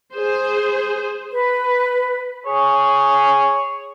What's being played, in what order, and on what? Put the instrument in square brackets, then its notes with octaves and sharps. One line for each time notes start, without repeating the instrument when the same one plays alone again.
[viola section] G#4 C5
[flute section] B4
[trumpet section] G#4 [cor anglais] C#5